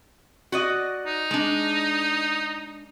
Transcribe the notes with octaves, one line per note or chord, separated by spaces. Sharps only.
F#4 D5 D#5
D#4
G#3 D4